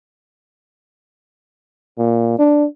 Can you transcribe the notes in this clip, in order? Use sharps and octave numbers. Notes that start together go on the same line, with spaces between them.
A#2
D4